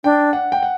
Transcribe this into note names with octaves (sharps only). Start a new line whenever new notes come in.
D4 G5
F#5
G5
F#5